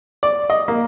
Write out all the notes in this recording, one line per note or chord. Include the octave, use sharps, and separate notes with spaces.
D5
D#5
A#3